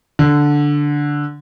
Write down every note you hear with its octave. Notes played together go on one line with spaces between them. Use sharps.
D3